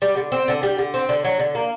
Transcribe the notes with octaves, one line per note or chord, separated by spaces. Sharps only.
G3
D3
C4
D3
G3
D3
C4
D3
F#3
D3
A#3